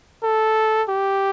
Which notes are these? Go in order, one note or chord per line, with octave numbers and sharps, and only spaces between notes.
A4
G4